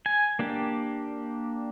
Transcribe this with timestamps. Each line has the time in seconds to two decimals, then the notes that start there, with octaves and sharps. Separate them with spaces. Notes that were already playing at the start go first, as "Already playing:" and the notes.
0.06 G#5
0.39 A#3 D4 G4